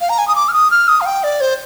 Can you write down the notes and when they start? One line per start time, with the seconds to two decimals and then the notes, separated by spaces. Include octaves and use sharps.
0.01 F5
0.09 A#5
0.18 G#5
0.28 D#6
0.36 D6
0.48 F6
0.53 D#6
0.71 F6
0.88 D#6
1.01 F5
1.06 G5
1.23 D5
1.41 C5